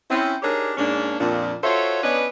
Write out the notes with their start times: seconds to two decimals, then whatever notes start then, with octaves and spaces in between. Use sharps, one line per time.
0.10 C4 C#4 E4
0.42 D4 D#4 G4 G#4 A#4 C#5
0.77 G#2 A#3 C#4 D4
1.20 F2 A#2 D4
1.64 F4 F#4 A4 C5 C#5 E5
2.03 B3 C#4 D4 B4 C#5 D#5